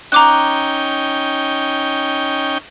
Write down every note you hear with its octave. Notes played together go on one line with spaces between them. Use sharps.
C#4 D#4 G5 A#5 D6 F#6